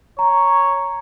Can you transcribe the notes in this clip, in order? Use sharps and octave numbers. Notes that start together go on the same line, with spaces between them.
C#5 A#5